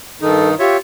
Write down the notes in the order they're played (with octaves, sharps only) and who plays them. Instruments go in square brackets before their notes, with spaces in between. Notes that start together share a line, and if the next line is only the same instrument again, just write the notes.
[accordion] G2 D#3 D#4 [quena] A4
[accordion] F4 C#5 E5 [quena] G4